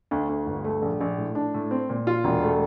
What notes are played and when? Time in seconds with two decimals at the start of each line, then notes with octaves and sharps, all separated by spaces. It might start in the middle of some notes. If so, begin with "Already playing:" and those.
0.11 D2
0.29 D2
0.46 G1
0.64 A3
0.82 A#1
1.01 A#1
1.18 A2
1.35 D4
1.54 A2
1.71 C4
1.90 A#2
2.07 F4
2.24 E1
2.43 A3